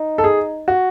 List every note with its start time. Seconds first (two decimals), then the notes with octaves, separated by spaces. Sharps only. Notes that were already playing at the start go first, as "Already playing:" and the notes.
Already playing: D#4
0.18 A4
0.24 G#4
0.68 F#4